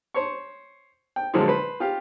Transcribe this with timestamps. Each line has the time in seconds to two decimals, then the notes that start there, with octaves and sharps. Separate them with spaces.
0.14 C5 C#5 C#6
1.16 G5
1.34 A#2 D3 F3 F#3 G#3
1.48 B4 C5
1.80 F4 G4 F5